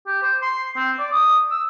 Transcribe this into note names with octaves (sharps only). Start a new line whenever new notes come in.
G4
C5
C6
C4
D5
D#6
E6